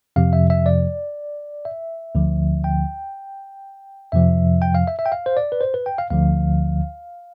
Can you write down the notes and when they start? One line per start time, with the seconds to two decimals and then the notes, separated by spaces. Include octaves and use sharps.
0.16 F2 C3 F3 F5
0.33 E5
0.50 E5
0.66 D5
1.65 E5
2.15 D2 D3 F3
2.64 G5
4.12 F2 C3 F3 E5
4.62 G5
4.75 F5
4.87 E5
4.99 E5
5.06 G5
5.12 F5
5.26 C5
5.37 D5
5.52 B4
5.61 C5
5.74 B4
5.86 G5
5.98 F5
6.10 D2 D3 F3 F5